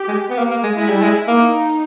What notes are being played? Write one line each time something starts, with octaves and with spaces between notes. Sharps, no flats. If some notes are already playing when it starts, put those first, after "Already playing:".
Already playing: G4
G#3
B3
A#3
A#3
G#3
G#3 E4
G3
G#3
A#3 D#4